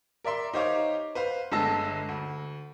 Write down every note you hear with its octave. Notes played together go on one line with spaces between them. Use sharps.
A#4 D5 E5 C6
D#4 G4 C5 C#5 F5 D6
B4 C5 F5
G1 D3 G#3 A5 E6 A#6
D2